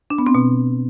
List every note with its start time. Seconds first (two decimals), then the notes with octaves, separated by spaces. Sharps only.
0.10 D4
0.18 B3
0.27 C4
0.35 B2